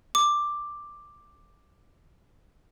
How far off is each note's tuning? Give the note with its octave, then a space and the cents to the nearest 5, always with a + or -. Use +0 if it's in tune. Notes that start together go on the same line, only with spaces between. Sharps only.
D6 +5